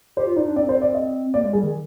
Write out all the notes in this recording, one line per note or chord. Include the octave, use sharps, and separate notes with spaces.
G4 C5
F4
D#4 D5
D4
C4 D5
C5
D5
D#5
A#3 D5
G#3
G3 G#4
D#3